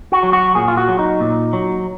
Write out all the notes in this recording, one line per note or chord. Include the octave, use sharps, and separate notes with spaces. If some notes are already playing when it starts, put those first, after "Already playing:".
F#4
F#3
F#4
A#2 G#4
F4
F#4
F#3
D#4
A#2
F#3